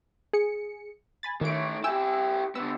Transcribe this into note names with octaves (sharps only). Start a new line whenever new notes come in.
G#4 C#7
G#5 B5 A6
D#3 E3 A3 D7
E4 G4 G5 G#5 E6
D3 B3 E6